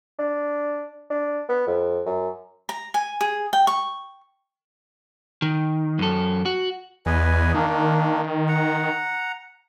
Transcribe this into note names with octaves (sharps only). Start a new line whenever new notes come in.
D4
D4
B3
F2
F#2
A#5
G#5
G#4
G5
C#6
D#3
F#2 A4
F#4
E2 B4 D#5 G#5
D#3 A#3 D4
F#5 A#5